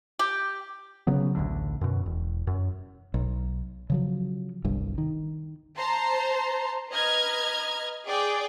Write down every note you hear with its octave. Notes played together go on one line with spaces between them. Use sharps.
G4
C#3 F#3 B3
A1 D2 D3
F#2 B2
E1
F#2
B1
C#3 F3 F#3
G1 C2 G2
D#3
C5 A5 A#5 C6
B4 D#5 A#5 F6 G#6
G#4 D5 G5 D6